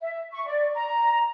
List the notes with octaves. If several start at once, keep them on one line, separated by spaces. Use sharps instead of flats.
E5
C#6
D5
A#5